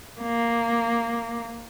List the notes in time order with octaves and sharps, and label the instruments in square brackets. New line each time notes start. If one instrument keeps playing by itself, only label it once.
[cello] A#3